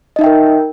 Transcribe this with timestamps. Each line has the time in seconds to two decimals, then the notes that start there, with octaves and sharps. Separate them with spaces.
0.16 D#5
0.19 D#4
0.21 E5
0.24 G5
0.26 A#4